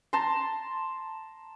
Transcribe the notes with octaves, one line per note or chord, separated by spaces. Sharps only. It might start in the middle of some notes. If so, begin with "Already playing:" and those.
A5 A#5 C6